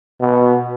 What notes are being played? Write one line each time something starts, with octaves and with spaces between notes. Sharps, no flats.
B2